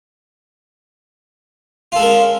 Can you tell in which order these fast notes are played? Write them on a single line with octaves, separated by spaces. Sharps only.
F4 A4 G#3 A#4 C#4